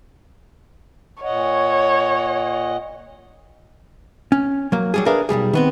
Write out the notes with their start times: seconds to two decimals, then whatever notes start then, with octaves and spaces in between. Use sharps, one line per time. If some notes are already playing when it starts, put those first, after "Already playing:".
1.23 A#2 C#5 D#5 F#5
4.32 C#4
4.72 F#3 A#3
4.94 F#3 G3 G#4
5.06 D4 G#4 A#4 B4 E5 F5
5.29 B1 D3 G3 G#4
5.53 D#3 B3 C4